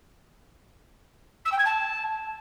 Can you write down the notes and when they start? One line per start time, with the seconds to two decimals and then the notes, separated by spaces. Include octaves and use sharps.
1.45 E6
1.52 G5
1.58 G#6
1.65 A5